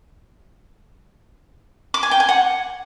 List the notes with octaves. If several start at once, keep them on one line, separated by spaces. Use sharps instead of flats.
D6
G#5
G5
G#5
F#5